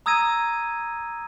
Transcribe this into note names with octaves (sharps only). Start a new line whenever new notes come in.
A#5 D#6 E6 G#6 A#6 D#7